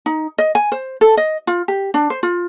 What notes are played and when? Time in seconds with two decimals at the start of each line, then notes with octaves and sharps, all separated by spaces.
0.06 D#4
0.38 D#5
0.55 G#5
0.72 C5
1.01 A4
1.17 D#5
1.47 F4
1.68 G4
1.94 D4
2.10 C5
2.23 F4